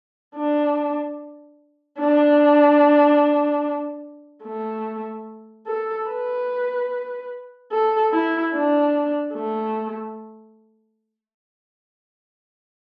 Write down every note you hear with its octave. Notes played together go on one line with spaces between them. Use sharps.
D4
D4
A3
A4
B4
A4
E4
D4
A3